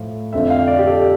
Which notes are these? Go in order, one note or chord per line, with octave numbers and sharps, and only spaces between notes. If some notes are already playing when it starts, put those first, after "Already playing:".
Already playing: A2 F3
F2 D3 F3 E5
F5
D5
G4
A4